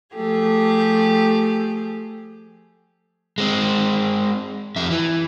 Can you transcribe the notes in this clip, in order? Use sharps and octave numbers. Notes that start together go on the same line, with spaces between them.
F3 A3 G4 G#4
G#3 C4
F2 E5
E3